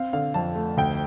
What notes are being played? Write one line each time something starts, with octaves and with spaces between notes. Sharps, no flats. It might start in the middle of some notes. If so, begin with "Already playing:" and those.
Already playing: C4 F5
D3 F5
F2 A5
A3
D2 G5